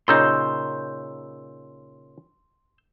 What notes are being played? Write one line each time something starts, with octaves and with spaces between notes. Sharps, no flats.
A#2 C#3 D#4 C6 E6 G6